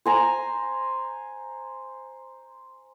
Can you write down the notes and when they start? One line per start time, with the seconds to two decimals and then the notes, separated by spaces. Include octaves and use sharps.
0.06 C5 G#5 A#5